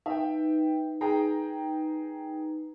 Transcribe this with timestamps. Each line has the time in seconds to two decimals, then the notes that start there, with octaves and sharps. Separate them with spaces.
0.06 D#4 B4 E5 G5
1.01 G#4 G5 A#5